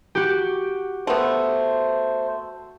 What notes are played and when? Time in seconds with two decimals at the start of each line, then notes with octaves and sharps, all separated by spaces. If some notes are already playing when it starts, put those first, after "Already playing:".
0.15 F#4 G4
1.07 A3 B3 C5